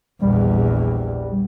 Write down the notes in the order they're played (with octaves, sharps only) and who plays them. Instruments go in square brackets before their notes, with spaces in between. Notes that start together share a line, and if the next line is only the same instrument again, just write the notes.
[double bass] A#1 E2 [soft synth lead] G3